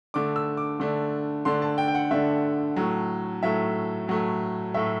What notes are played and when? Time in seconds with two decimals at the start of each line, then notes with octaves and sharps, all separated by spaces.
0.14 D3 A3 D4 D6
0.36 E6
0.57 D6
0.80 D3 A3 D4
1.45 D3 A3 D4 C6
1.62 A5
1.78 G5
1.88 G5
1.95 F#5
2.11 D3 A3 D4 E5
2.76 A2 F#3 A3
3.43 A2 F#3 A3 E5
4.08 A2 F#3 A3
4.74 A2 F#3 A3 E5